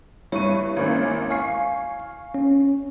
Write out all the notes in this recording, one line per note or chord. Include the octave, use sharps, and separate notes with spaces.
G2 E4 C#5 C#6 D#7
G#1 A#3 C#4
F5 G#5 C#6 C7
C#4